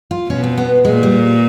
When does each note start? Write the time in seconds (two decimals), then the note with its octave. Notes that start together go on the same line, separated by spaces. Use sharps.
0.11 F4
0.29 B2 C#4
0.43 C4
0.58 B3
0.85 A#2 G#3
1.03 G3